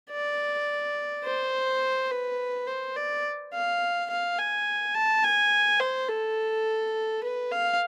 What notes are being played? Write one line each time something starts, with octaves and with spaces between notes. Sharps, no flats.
D5
C5
B4
C5
D5
F5
F5
G#5
A5
G#5
C5
A4
B4
F5